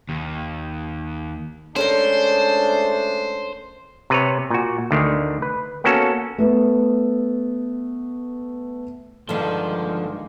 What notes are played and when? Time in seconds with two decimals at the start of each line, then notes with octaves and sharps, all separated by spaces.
0.09 D#2
1.76 G#3 A3 C#4 D4 A4 A#4 C5
4.10 C3 B4 C#5
4.50 A#2 F#4
4.91 D2 D3 D#3
5.42 B4
5.84 A#3 B3 C#4 F#4 A4
6.38 A3 B3
9.29 G2 D3 D#3 F3 G#3 A#3